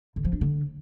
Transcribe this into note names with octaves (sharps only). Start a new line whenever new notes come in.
D3
F3
D4
D3